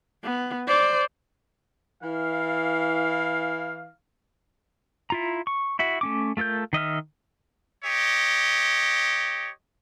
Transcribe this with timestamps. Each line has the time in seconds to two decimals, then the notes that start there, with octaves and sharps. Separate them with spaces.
0.24 B3
0.67 C5 D5
2.02 E3 F5
5.10 E4 F4 A#5
5.47 C#6
5.79 E4 F#4 E5
6.01 A3 C#4 D6
6.37 A3 F4 A4 A#4 G6
6.73 D#3 D#5 E5 F6
7.83 G4 C#5 D#5